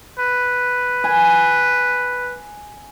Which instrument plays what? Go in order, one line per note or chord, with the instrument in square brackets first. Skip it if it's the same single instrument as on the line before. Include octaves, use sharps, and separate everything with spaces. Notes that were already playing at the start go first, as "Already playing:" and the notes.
[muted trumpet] B4
[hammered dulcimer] G#5